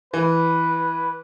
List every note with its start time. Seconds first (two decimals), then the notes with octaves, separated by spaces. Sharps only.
0.14 E3 B4